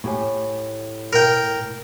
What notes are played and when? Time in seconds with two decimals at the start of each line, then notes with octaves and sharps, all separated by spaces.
0.04 A2 G4 G#5
1.13 A#4 G5